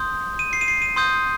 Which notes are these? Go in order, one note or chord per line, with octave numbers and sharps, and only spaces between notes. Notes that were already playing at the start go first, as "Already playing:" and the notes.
Already playing: C6 D#6 G6
D#7
C7
D#7
C7
D#7
C6 D#6 G6